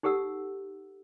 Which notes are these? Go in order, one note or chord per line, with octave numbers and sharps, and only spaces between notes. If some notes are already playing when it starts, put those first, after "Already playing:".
D#4 G4 A4 F#5 E6